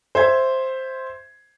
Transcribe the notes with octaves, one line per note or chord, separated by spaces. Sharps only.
C5 E5 G#6